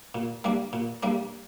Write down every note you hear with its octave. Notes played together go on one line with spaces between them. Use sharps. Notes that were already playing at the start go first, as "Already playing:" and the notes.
A#2
G3 A#3 D4
A#2
G3 A#3 D4